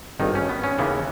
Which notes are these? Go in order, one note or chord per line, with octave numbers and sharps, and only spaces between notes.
G#1 G2 D#3 D#4
C#4
B3
C#4
D#2 C#3 E3 A#3 B3